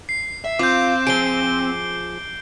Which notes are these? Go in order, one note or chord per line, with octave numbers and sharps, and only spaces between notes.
C7
E5
C4 F4 D6 G6
F3 G#4 D7 G7